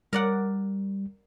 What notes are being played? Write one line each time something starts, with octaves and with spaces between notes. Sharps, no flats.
G3 A#4 D5 F#5